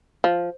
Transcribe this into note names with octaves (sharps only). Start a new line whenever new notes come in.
F3